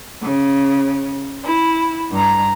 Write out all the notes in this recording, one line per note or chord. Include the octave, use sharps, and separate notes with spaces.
C#3
E4
G2 A#5